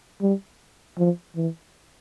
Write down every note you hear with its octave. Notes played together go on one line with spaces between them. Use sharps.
G3
F3
E3